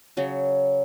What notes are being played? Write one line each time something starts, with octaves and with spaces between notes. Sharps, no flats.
C#3 F#3